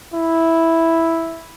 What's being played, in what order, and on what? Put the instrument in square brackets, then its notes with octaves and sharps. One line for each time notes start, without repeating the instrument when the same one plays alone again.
[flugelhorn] E4